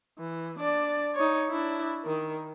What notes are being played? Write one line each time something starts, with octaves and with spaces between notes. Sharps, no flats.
E3
D4 D5
D#4 C#5
D4 E4
D#3 A#4